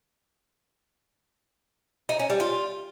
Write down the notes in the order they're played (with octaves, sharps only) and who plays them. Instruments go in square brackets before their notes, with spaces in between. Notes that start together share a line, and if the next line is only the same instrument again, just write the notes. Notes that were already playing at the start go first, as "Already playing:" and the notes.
[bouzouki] D#4
C#4
G3
F4